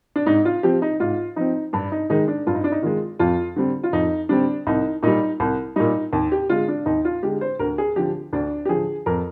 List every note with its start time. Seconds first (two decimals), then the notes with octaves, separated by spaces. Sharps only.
0.16 D4
0.26 G#2 D#4
0.45 F4
0.63 F3 C4 G4
0.82 D#4
1.00 G#2 F4
1.36 F3 C4 D#4
1.73 G2 D4
1.92 D#4
2.10 D#3 G#3 D#4
2.28 D4
2.47 G2 F4
2.55 D#4
2.64 D4
2.72 D#4
2.83 D#3 G#3 F4
3.19 F2 F4
3.56 D3 G3 C4
3.83 F4
3.93 F2 D#4
4.29 D3 G3 C4 D4
4.67 C2 D#4
5.03 A#2 G3 D#4
5.40 C2
5.76 A#2 G3 D#4
6.13 D#2
6.32 G4
6.49 D3 G#3 F4
6.68 D4
6.86 D#2 D#4
7.05 F4
7.23 D3 G#3 G4
7.41 C5
7.59 D2 A#4
7.78 G#4
7.96 D3 F3 G4
8.33 D2 D4
8.65 G4
8.69 D3 F3 G#4
9.06 F2 A#4